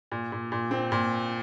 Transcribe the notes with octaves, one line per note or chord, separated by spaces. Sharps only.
A#2
A#2
A#2
C4
A#2